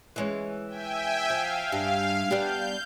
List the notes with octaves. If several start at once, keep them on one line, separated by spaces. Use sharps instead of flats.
E3 G#3 C#4
E5 G5 G#5
F3 F5
G2
G3 B3 D4 G6